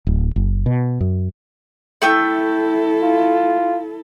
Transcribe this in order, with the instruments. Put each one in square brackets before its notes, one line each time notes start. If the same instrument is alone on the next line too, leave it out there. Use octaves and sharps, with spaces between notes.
[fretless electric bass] D1
F#1
B2
F#2
[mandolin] A3 G5 E6 [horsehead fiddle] E4 A4
[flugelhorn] F4